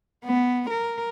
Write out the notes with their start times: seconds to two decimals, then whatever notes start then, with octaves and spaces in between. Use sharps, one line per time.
0.25 B3
0.70 A#4